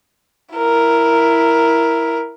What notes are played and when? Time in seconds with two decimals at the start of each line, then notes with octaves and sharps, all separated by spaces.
0.55 E4 A#4